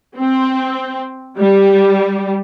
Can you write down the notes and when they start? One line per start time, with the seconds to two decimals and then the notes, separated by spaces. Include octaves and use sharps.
0.17 C4
1.38 G3